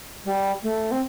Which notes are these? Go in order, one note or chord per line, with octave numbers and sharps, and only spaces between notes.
G3
A3
C4